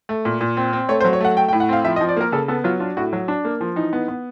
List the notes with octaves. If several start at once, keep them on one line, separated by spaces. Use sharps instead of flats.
A3
A#2
A#2
C4
C4
A3 C#5
C5
F#3
C#5
A3 F#5
A3 G5
G5
A2
F#5
C4 F5
F3 E5
D#5
F3
D5
A#3 A#4
C#3 A4
B3 A4
F#3 F4
D4 F4
A2 F#4
F#3
D4
A#3
F3
E3 D#4
B3
B3